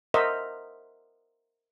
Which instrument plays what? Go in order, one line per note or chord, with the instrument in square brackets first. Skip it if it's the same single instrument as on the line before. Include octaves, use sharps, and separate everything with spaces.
[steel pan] A#4 C5 D#5 E5 F#5